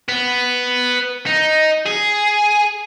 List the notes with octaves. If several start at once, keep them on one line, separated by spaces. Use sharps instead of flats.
B3
D#4
G#4